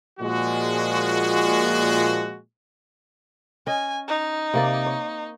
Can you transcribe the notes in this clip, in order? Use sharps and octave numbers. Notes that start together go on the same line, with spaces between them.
A#2 F3 G#3 F#4
C#4 D#5 G#5
D#4
C3 A#3 D5
C#5